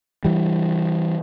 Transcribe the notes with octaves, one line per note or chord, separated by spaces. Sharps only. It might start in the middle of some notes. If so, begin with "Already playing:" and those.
E3 G3